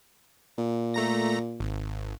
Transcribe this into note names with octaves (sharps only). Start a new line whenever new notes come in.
A#2
A3 A#5 A#6
G#1